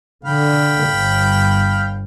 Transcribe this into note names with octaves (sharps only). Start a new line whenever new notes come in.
D3 F5 G5 B5
G1